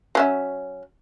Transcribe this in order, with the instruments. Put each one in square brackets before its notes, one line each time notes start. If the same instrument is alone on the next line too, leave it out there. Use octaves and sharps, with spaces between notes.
[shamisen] F#3 C#4 E5